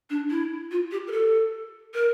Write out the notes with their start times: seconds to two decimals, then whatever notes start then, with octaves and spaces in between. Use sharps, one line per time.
0.10 D4
0.30 E4
0.71 F4
0.91 G4
1.07 A#4
1.12 A4
1.94 A#4